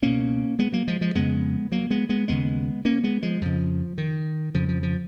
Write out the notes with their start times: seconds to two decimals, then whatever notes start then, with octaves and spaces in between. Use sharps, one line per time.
0.02 C#2 B2 A#3 C#4
0.59 G#3 B3
0.73 F#3 A#3
0.88 F3 G#3
1.01 F3 G#3
1.15 F2 C#3 G#3 B3
1.72 F#3 A#3
1.90 G#3 B3
2.09 G#3 B3
2.28 D#2 C#3 G#3 B3
2.85 A#3 C#4
3.04 G#3 B3
3.23 F3 G#3
3.41 F2 C#3 F3
3.98 D#3
4.54 F2 C#3 F3
4.69 F3
4.83 F3